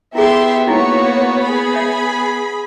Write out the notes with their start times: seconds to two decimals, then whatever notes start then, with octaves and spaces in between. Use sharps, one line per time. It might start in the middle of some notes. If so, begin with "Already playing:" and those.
0.15 B3 E4 G4 G#4 E5 C6
0.67 A#3 D#4 E4 F#4 C#5 G#5
1.42 G#4 B5
1.74 C#5 E5